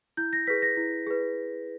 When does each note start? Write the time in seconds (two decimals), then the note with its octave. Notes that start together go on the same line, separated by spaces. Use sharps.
0.17 E4 G6
0.33 A#6
0.47 G#4 B4 B6
0.62 A#6
0.77 E4
1.07 G#4 B4